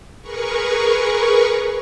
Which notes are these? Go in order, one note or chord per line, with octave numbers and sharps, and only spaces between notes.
G#4 A#4 B4 C#6